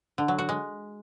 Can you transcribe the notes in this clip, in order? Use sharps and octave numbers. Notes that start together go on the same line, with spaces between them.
D3
F#3
F#4
G#3